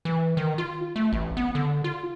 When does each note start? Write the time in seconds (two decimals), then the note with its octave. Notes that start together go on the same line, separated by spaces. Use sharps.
0.05 E3
0.37 D#3
0.58 F4
0.96 A3
1.13 A1
1.37 B3
1.55 D3
1.84 F4